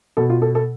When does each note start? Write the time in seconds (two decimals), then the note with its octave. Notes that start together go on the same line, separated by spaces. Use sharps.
0.17 B2 A4
0.30 F4
0.42 A4
0.55 A4